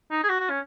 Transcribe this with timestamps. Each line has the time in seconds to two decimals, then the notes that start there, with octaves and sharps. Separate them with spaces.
0.11 D#4
0.24 G#4
0.29 F#4
0.40 F#4
0.50 C#4